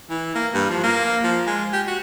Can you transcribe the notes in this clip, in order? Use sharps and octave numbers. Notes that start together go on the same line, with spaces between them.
E3
A#3
G2
F3
A#3
F3
G#3
G4
F#4